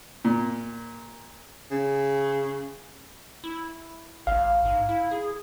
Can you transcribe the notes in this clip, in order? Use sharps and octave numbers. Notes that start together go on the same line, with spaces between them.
A#2
C#3
E4
A1 F5
G#2
E4
G#4